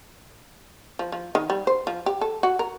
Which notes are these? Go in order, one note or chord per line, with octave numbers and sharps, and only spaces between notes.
F3
F3
D#3
G3
C5
F3
G4
A4
F#4
A#4